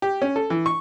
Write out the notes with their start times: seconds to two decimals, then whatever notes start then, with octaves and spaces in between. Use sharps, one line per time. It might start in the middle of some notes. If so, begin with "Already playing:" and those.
0.02 G4
0.22 C#4
0.36 A4
0.50 E3
0.66 C#6